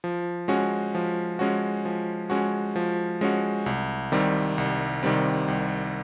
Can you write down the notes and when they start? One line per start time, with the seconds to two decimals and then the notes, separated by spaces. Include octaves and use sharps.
0.04 F3
0.48 G#3 C#4 F#4
0.95 F3
1.39 G#3 C#4 F#4
1.85 F3
2.30 G#3 C#4 F#4
2.76 F3
3.21 G#3 C#4 F#4
3.66 C2
4.12 C3 D#3 G3 C4
4.58 C2
5.03 C3 D#3 G3 C4
5.48 C2